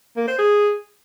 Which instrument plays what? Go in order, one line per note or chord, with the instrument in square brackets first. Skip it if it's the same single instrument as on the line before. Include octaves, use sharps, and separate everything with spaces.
[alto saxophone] A#3
C5
G#4